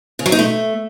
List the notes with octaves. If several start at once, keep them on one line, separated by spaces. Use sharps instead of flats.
C#3
F#3
D#4
A3